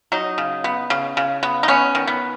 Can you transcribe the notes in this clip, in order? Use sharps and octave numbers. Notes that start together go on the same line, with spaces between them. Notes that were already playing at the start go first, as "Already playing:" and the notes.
F#3 D#4
C#3
B3
C#3
C#3
B3
D#4
B3 C#4
D#3
B3